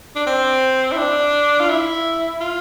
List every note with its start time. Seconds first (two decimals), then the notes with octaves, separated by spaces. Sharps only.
0.16 D4
0.26 C4
0.92 E4
0.98 D4
1.60 F4
1.69 E4
2.41 F4